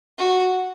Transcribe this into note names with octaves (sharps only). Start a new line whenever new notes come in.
F#4